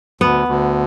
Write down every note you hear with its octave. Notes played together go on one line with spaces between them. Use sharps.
D2 B3
D2